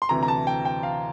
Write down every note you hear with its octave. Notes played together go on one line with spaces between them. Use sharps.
C6
D2 C3 E3 A#5
A#5
A5
G5
G5
F5